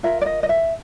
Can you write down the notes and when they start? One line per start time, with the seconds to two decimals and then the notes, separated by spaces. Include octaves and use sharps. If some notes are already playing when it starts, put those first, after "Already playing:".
0.03 F4 A#4 E5
0.21 D5
0.26 D#5
0.43 D#5
0.49 E5